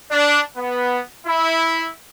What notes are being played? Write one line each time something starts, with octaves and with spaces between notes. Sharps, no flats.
D4
B3
E4